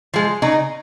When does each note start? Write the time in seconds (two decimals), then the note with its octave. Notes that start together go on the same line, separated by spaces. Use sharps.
0.14 F3 G#3
0.42 C#3 D#4